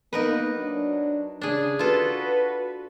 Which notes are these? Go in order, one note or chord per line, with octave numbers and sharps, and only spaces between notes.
A#3 B3 D#4 A#4 B4
F#3 D4
C#3 D4 G#4
F4 F#4 A4 B4